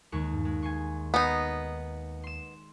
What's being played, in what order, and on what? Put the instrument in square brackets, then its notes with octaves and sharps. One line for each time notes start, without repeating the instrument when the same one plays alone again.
[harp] D#2 G#3 C#6
G2
G#3
G#5 C6 C#6
[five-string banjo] B3 D#4
[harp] C6 E7